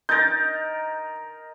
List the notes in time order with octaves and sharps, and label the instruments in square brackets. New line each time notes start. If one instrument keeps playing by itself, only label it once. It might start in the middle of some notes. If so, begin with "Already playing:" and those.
[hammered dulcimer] D#4 A#4 [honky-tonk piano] G6 A6